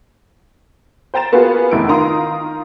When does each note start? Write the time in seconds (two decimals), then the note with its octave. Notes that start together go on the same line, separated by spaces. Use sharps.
1.14 C5 G5 A#5 A6 E7
1.32 A#3 B3 F4 F#4 G#4 B4
1.71 F1 E2 E4 D7
1.88 D#3 F4 A#5 C6 D#6